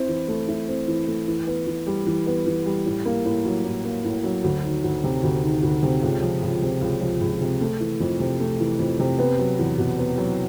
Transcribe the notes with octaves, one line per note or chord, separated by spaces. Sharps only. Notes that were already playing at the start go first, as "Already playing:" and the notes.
Already playing: C4 E4
E3
A3
E4
C4
E3
A3
E3
B3
E3
G3
E3
B3
E3
G3
A2
A#3
A2
F#3
A2
A#3
A2
F#3
D2
D#3
D2
C3
D2
D#3
D2
C3
C#2
F3
C#2
C3
C#2
F3
C#2
C3
A3
E3
F2
C3
A3
E3
F2
C3
B3
F#3
E2
B2
B3
F#3